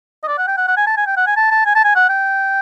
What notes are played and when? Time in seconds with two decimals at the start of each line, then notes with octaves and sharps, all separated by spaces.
0.23 D#5
0.28 D5
0.38 F#5
0.47 G5
0.57 F#5
0.68 F#5
0.77 G#5
0.87 A5
0.97 G#5
1.07 G5
1.17 F#5
1.27 G#5
1.37 A5
1.51 A5
1.66 G#5
1.75 A5
1.85 G#5
1.95 F#5
2.09 G5